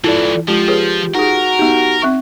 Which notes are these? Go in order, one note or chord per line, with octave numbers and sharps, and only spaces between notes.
G2 E3 E4 F4 A4 D5
F3 G#3 F4 G4
G#4 B4 C#5
D#4 F#4 G#4 A#4
B3 D#4 G4
C4 E5 C#6